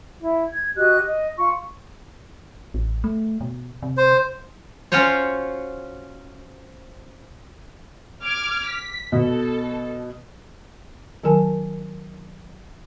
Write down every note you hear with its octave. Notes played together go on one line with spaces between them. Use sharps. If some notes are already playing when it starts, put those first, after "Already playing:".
E4
G#6
F#4 G4 D#5 F#6
D#5
F4 C#6
A1
A3
B2
C3
C5
C#4 F4 F#4 C5 C#5
D6 F6 G#6
B6
B2 A4
D#3 F#3 D#4 A#4 G#5 A5